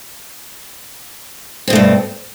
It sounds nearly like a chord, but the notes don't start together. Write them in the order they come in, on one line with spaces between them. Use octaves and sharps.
C4 B2 A3 G2